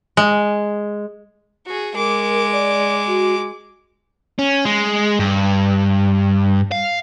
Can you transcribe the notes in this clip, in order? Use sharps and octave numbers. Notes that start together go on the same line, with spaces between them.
G#3
F#4 G#4
G#3 A#4 D6
D5
F#4
C#4
G#3
G2
F5